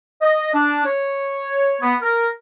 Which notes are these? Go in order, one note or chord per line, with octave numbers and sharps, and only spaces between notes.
D#5
D4
C#5
B3
A#4